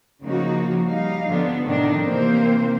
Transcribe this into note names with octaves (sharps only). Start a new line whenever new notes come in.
C#3 F3 A#3 D#4 F#4
G3 D#4 F5
D3 F3 B3 D4
A2 C3 D#3 D4 D#4
C3 E3 A#3 C4 C5